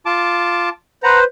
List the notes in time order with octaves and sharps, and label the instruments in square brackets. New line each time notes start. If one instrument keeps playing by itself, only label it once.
[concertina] F4 A5 D6
[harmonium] B4 C5 [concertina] F#5 A#5